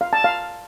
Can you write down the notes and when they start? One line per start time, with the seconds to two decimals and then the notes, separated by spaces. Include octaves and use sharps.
0.01 F5
0.13 A5
0.24 F5